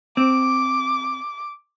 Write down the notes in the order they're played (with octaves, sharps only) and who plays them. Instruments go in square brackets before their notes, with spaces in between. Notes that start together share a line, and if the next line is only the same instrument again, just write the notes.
[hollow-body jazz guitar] C4 [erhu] D6